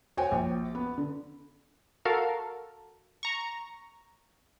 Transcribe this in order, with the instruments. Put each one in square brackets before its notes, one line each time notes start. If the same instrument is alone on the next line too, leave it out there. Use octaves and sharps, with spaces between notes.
[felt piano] F#4 C5 C#5 G5 G#5
A#1
B3
D3
[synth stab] F#4 A4 A#4 F5
A#5 C#6